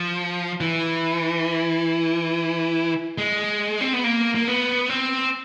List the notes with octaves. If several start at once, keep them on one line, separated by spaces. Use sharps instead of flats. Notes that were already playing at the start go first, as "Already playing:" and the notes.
Already playing: F3
E3
G#3
C4
B3
A#3
A#3
B3
C4